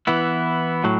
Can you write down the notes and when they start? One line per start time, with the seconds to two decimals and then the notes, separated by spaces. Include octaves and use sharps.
0.07 E3 B3 E4
0.84 A2 F#3